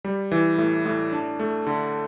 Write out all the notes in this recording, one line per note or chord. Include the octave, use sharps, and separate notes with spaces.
G3
E3
A2
A2
D4
A3
D3